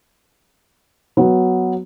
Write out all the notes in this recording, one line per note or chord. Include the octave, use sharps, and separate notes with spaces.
F#3 B3